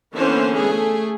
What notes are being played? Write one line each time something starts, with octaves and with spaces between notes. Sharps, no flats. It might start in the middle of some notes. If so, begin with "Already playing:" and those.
D3 E3 A#3 B3 C#4 C5
A3 G#4